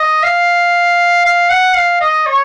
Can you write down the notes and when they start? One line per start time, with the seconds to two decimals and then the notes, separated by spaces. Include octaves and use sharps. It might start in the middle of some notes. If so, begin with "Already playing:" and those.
Already playing: D#5
0.23 F5
1.25 F5
1.51 F#5
1.76 F5
2.01 D#5
2.26 C#5